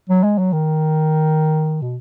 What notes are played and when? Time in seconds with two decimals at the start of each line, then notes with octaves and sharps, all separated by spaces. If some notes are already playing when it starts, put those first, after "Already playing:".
0.10 F#3
0.24 G#3
0.38 F#3
0.53 D#3
1.82 B2